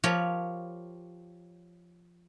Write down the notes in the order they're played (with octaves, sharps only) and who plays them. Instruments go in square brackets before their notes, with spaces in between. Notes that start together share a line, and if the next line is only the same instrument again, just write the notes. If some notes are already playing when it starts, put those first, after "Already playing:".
[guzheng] F3 G4 A#4 C#5 G5 B5